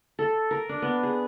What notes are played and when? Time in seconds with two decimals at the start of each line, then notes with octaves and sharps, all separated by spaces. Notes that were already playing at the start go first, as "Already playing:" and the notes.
0.19 A4
0.51 A#4
0.69 D4
0.82 B3
1.03 G#4